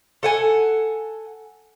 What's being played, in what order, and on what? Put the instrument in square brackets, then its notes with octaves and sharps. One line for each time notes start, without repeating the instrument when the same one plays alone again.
[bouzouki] A4 F#5 G#5